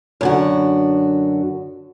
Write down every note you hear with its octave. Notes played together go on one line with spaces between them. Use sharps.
F#2 D3 F#4